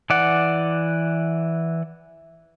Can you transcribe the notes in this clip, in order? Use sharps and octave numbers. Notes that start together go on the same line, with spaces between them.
E3 D5 F#5